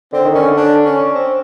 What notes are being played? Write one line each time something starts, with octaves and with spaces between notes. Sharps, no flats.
D3 C4
D#3
D3 C#4
D4
C#4
C4